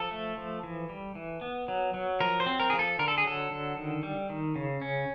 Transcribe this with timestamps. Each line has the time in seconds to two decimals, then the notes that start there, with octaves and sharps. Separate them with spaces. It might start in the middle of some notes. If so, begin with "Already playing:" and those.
Already playing: F3 A4
0.11 A3
0.37 F3
0.63 E3
0.89 G3
1.15 E3
1.41 B3
1.68 F#3
1.94 F#3
2.20 F3 A#4
2.40 C5
2.46 C4
2.60 A#4
2.70 F3 G#4
2.79 A4
2.99 D3 A#4
3.08 A4
3.18 G#4
3.24 F#3 A4
3.51 D3
3.77 D#3
4.03 G3
4.30 D#3
4.56 C#3
4.81 C#4